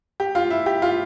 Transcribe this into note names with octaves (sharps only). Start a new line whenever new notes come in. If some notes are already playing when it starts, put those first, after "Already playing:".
G4
F4
E4
G4
F4